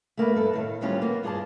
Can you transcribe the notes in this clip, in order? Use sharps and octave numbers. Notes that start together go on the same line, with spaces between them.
A3 A#3 G#4 B4
G2 A4 B4
A2 D#3 F5
D2 D#3 F#3 G3 C#4 F4
A#3 B3
G2 F4 G#4 D5 A5